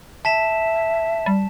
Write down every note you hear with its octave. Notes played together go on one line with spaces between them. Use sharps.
E5 A5 B6 E7
G3